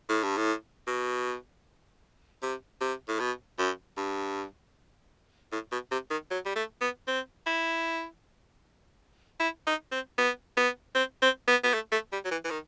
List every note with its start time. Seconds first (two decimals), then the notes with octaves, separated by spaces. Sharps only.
0.09 A2
0.23 G2
0.37 A2
0.88 B2
2.43 C3
2.81 C3
3.08 A2
3.19 B2
3.59 F#2
3.97 G2
5.52 A2
5.72 B2
5.91 C3
6.11 D#3
6.30 F#3
6.46 G3
6.56 A3
6.81 B3
7.08 C4
7.47 E4
9.40 E4
9.67 D#4
9.92 C4
10.18 B3
10.57 B3
10.95 C4
11.22 C4
11.48 B3
11.64 B3
11.74 A3
11.92 A3
12.12 G3
12.25 F#3
12.31 E3
12.45 E3
12.51 D#3